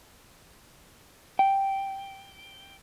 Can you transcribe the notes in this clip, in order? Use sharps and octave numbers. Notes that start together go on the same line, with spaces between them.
G5